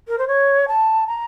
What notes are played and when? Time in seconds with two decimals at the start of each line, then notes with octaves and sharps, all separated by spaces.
0.08 A#4
0.18 C5
0.27 C#5
0.68 A5
1.07 A#5